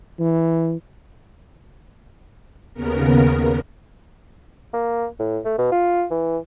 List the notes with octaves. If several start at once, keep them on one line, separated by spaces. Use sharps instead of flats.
E3
D#2 C#3 B3 A#4
A#3
A2
A3
B2
F4
E3